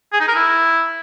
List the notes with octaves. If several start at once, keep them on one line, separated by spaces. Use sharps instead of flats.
G#4
D#4
A#4
E4